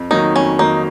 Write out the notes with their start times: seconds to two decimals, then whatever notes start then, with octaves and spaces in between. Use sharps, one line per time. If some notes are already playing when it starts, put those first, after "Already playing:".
Already playing: F2
0.11 D#3 F#3 A#3 D#4
0.35 F2 C#4
0.59 D#3 F#3 A#3 D#4